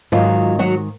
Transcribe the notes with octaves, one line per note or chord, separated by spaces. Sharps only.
G#2 D#3 F3 F#3 F4
F#3 F#4